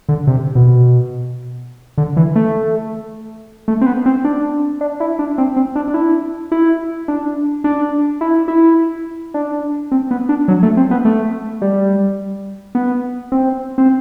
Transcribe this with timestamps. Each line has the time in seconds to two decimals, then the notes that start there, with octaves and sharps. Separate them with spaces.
0.09 D3
0.27 C3
0.55 B2
1.98 D3
2.17 E3
2.35 A3
3.68 A3
3.81 C4
3.86 B3
4.06 C4
4.24 D4
4.81 D4
5.00 E4
5.19 D4
5.38 C4
5.56 C4
5.76 D4
5.88 D4
5.94 E4
6.52 E4
7.08 D4
7.64 D4
8.21 E4
8.48 E4
9.34 D4
9.91 C4
10.11 B3
10.29 D4
10.48 F#3
10.63 A3
10.77 C4
10.91 B3
11.05 A3
11.62 G3
12.75 B3
13.32 C4
13.78 C4